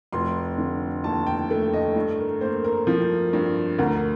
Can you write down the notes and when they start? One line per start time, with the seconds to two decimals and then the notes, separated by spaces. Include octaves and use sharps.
0.13 F1 C6
0.58 D3
1.04 D#2 A5
1.27 G5
1.51 A3
1.73 D#5
1.96 G2
2.19 A#4
2.41 A#3 C5
2.64 A#4
2.87 F3
3.33 G2
3.79 D2 A#4